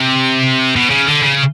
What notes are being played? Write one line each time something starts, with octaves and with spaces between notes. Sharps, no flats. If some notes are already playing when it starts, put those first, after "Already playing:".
Already playing: C3
B2
C#3
D3
C#3